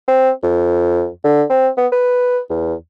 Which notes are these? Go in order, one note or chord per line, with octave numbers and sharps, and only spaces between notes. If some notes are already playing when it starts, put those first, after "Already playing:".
C4
F2
D3
C4
B3
B4
E2